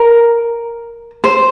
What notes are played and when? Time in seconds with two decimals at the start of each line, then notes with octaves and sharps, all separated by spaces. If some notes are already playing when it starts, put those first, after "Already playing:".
Already playing: A#4
1.24 C5